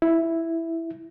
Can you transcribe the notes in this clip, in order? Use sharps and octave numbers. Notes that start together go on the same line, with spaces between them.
E4